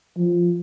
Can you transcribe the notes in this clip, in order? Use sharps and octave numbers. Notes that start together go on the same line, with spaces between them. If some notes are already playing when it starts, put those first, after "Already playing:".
F3